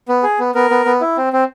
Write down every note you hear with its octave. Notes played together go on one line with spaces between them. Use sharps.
B3
G#4
B3
B3 A#4
B3
B3
E4
C4
C4